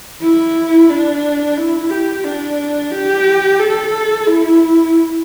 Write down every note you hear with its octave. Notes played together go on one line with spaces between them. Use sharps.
E4
D4
E4
G4
D4
G4
A4
E4